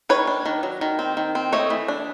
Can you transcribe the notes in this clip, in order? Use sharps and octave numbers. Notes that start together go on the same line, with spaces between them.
D#3 B4 C#5
D4
D#3
F#3
D#3
C4
D#3
C4
A3 C#5 D#5
E3
D4